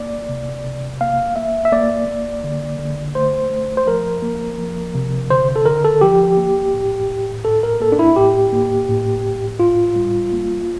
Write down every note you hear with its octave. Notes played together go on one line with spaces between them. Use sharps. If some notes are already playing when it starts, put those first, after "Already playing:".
Already playing: A#3 D5
C3
C3
A#3 F5
A#3 E5
E5
A#3 D5
A#3
D3
D3
A3 C5
A3
C5
F3 A#4
A#3
F3
C3
D3 C5
A4
D3 A#4
A4
F3 G4
A#3
A2
A2
A2 A4
A#4
A#3 A4
D4
E4
A2 G4
A#3
A2
A2
A2 F4
G3
A#3